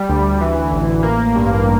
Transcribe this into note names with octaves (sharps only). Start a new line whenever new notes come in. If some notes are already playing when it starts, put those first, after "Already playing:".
Already playing: G3
D2
E3
A1
A#3
G2